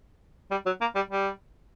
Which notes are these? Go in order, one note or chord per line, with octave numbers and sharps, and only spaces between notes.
G3
F#3
A#3
G3
G3